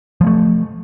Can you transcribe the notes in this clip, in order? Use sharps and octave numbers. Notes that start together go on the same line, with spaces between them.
F3 G#3 A3